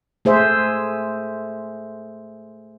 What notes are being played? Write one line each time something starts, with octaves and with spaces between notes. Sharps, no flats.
A3 G#4 C5 E5